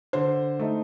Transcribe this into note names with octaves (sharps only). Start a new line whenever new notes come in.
D3 C5
A3 D#4